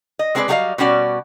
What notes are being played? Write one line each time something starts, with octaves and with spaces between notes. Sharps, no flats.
D#5
G#3 B3 C4 G#4 B4 D5
F#3 G3 F#4 G#4 D#5 F5
B2 G3 C#4 F#4 D5